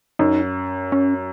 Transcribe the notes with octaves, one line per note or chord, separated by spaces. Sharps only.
F#2 D#4
C#4